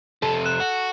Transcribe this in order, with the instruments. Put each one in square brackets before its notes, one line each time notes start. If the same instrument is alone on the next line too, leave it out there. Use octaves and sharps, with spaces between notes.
[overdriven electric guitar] F2 C3 [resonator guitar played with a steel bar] A4
[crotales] F#6 E7
[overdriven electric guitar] F#4